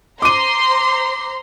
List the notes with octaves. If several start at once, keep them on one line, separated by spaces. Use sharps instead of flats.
C5 A#5 C6 D6 D#7